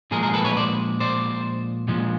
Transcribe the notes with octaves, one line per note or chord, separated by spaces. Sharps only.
A#2 F3 G#3 G#4 A#4
G#4 A#4
A4 B4
B4 C#5
C5 D5
C5 D5
A#2 F3 G#3